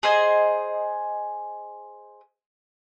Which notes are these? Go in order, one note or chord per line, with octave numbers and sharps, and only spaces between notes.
G#4 C5 D#5 G#5